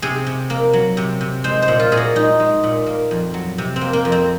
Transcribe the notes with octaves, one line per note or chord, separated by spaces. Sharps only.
C3 G#4
C3
A#3
F#3
C3
C3
G#3 C5
C5
A#2
F4
A#2 G#4
F#4
G#3 D#4
G#3
A#2
A#3
F2
F#3
C3
C4
A#3
A#3
F2
C4